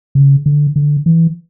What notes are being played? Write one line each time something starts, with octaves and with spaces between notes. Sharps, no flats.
C#3
D3
D3
E3